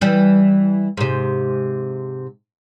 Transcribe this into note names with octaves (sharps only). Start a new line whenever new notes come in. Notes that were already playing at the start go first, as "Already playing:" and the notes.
E3 G3
G#2 C3